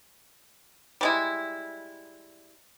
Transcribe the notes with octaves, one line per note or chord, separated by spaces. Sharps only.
G3 G#3 E4